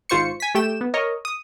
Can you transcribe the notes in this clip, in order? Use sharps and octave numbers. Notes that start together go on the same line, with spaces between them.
G#1 G#2 F4 C5 C#6 C#7
G#5 B6
A3 G4 G5 E7
B3
A#4 C#5 D#5
D#6